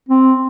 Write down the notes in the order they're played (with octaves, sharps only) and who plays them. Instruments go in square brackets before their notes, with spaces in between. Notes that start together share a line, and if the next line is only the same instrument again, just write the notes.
[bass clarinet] C4